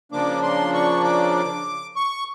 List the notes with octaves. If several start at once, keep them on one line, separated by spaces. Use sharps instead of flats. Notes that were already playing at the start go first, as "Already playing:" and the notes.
C#3 F3 A#3 D4 D6
C6
C#6
D6
C#6